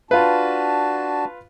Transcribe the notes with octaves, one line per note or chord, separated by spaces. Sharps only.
D4 F4 F#4 B4 A5